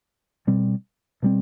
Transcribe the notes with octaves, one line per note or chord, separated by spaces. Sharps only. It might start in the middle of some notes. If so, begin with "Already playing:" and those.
B2 G3 C4
B2 G3 C4